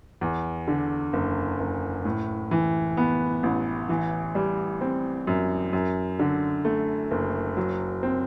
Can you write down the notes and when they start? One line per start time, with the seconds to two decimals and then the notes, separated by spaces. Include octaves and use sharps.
0.21 E2
0.68 D3
1.13 F#1
1.60 F#1
2.05 A2
2.51 E3
2.97 B3
3.43 A1
3.89 E3
4.35 G3
4.81 C4
5.27 F#2
5.73 F#2
6.19 D3
6.65 A3
7.11 F#1
7.57 F#3
8.03 C4